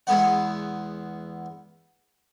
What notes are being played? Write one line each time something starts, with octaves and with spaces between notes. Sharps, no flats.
E2 G#3 B3 F#5